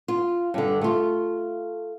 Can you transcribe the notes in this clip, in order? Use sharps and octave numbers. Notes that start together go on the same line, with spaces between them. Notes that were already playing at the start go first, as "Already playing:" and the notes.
F4
G2 D3
A3 F4